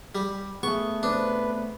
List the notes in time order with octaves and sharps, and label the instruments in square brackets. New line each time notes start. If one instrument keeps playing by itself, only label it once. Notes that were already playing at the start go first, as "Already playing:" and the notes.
[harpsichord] G3
[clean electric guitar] A3 B3 [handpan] G#4 [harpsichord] C#6
[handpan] C4 C5 [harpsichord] D4 [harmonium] B4